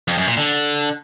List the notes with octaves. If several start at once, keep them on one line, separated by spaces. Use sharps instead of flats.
F2
F#2
A#2
D3